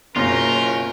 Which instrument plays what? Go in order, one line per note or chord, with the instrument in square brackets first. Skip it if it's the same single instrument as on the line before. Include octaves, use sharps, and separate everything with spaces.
[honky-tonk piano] F#1 B2 A#6 [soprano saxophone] C#4 [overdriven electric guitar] F4 [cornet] A#4